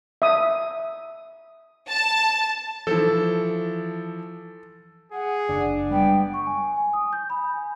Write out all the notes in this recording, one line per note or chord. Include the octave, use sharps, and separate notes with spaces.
E5 D#6
A5
E3 F3 A4
G#4 F#5
F#1 D4
G3 G#3 B3 G5
C#6
G#5
G#5
D#6
G6
B5
G#5